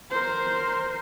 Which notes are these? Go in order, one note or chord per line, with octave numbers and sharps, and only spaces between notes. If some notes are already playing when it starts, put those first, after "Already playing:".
A#4 C5